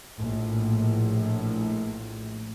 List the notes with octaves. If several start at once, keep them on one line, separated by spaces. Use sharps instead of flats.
A#1 A2